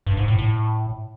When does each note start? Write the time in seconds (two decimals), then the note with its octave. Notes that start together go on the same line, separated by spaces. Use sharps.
0.07 G2
0.17 G#2
0.28 A2
0.39 A2